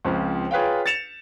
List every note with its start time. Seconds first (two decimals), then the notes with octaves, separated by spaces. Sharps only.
0.05 C#2 F3 C4
0.51 F4 G#4 B4 C#5 F5 G5
0.86 A6 C#7 E7 F7